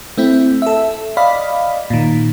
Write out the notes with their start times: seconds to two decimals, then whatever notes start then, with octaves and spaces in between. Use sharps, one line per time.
0.18 A3 C4 E4
0.62 A4 E5
1.17 D5 D#5 F5 B5
1.90 A#2 D#3